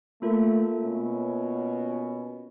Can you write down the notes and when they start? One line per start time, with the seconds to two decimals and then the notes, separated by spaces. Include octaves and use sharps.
0.22 A3 A#3 F4 A#4
0.81 B2 C#4